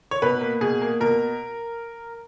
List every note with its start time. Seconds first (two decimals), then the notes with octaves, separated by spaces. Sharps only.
0.11 C#5
0.22 B2 B4
0.41 A#3
0.61 B2 G#4
0.81 A#3
1.00 B2 A#4